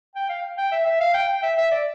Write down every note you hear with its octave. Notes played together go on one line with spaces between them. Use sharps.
G5
F5
G5
E5
E5
F5
G5
G5
E5
E5
D5